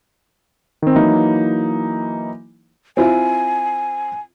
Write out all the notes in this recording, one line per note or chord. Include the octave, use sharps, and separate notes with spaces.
D#3 C4
E3 F#3 A#3 D#4 E4
C4 E4 F4 G#5